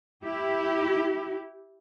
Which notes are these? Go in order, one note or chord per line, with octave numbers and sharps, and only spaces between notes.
E4 G4